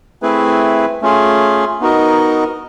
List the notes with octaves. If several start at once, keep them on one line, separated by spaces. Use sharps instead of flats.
A3 C4 E4 G#4 B4
A3 C#4 F4 G#4
B3 D#4 F#4 A#4 D#5